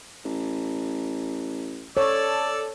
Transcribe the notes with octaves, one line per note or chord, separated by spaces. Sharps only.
A1
A4 C#5 D5 E6